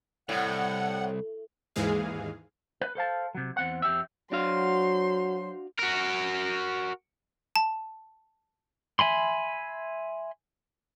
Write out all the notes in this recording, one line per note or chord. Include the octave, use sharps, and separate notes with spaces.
C2 A2 F#5
D#2 G#2 E3 G#3 G#4 F5
B4
A4 C5 F5 A5
C3 F#3
E2 C4 F#5
F2 G4 E5
F#3 D4 F#4 C5 F5 C6
F#4 A#4
A5
E5 G#5 B5 C6